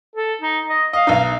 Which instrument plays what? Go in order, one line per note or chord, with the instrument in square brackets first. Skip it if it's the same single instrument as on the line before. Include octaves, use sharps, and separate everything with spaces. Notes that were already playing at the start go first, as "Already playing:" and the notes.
[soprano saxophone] A4
D#4
D#5
[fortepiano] D#5 [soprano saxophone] F5
[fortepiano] B1 D#4